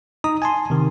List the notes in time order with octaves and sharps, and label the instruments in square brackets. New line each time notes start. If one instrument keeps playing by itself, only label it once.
[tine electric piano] D#4 A#5 D#6
G#5 A5 C6
C3 D#3